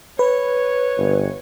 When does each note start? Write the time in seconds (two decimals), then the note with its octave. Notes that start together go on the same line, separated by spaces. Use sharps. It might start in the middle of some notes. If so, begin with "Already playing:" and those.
0.19 B4 C#5
0.98 G1